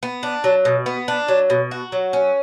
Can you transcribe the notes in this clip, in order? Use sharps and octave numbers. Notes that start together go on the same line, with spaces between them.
B3
D4
F#3
B2
B3
D4
F#3
B2
F#4
F#3
C#4